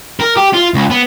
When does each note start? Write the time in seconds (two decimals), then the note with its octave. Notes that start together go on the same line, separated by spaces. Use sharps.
0.20 A#4
0.37 G4
0.54 F4
0.74 C#2
0.90 B3